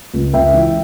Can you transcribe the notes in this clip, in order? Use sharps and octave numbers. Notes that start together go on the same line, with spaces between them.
C#2
C#2 E5 G5
E3